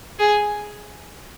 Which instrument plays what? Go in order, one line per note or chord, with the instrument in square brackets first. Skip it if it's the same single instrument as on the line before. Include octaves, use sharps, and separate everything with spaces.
[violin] G#4